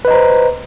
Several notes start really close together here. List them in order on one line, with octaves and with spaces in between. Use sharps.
B4 D#5 A#5 C5